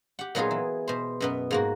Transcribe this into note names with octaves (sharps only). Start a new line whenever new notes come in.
G4 F#5
A#2 F#3 B3 D#4 F4 G#4
E3
B2 C5
F#2 B2 B3
G#2 A#3 F#4